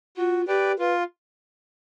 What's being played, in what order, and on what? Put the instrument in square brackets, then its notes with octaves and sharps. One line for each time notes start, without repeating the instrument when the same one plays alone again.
[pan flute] F4 [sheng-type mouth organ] F#4
[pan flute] G4 [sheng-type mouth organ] B4 D5 G5
[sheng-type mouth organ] F4 [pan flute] B4